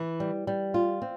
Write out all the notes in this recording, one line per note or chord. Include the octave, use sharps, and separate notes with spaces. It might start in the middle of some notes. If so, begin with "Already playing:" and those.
Already playing: E3
G3
G3
F4
C4